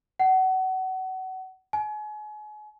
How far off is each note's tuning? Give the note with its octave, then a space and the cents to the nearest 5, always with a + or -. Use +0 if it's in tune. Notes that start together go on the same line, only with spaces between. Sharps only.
F#5 +25
G#5 +35